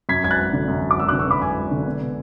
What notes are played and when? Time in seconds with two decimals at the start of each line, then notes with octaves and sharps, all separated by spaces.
0.09 F#2 G#6 B6
0.23 G#1 G#6
0.31 F#6 A6
0.38 G#1
0.53 D3
0.68 F#2
0.82 G#1
0.91 D6
0.97 G#1 E6
1.08 D6 F#6
1.12 D3
1.19 C#6 E6
1.27 F#2 B5 D6
1.42 G#1 G#5 B5
1.57 G#1
1.71 D3
1.86 B2
2.01 B2